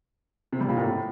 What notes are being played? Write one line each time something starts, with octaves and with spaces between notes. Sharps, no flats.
C3
G3
A#2
A2